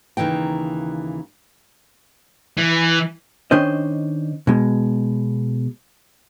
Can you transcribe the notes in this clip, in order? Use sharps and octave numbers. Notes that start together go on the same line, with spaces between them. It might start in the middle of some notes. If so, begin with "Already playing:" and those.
D#2 C#3 E3 D#4 G5
E3
D#3 C#4 D4 C5 D#5
B2 G#3